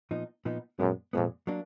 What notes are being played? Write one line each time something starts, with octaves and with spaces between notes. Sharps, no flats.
A#2 F3 B3 D#4
A#2 F3 B3 D#4
F#2 A#2 G#3 B3
F2 A#2 G#3 B3
F#3 A#3 D4